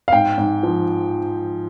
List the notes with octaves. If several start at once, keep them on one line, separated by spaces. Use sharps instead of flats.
F5
G#2 G5
G#2
F3